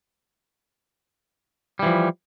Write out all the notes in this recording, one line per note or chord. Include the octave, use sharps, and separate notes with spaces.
E3 F3 G3